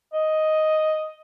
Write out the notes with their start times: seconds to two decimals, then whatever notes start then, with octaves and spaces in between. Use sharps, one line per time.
0.14 D#5